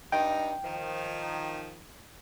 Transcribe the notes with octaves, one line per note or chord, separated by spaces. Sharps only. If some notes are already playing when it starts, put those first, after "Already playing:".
G2 D#4 G5
D#3 F3